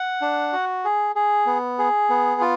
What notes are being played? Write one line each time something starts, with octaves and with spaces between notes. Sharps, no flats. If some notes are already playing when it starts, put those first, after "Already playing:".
Already playing: F#5
D4
F#4
G#4
G#4
B3
G#4
B3
F4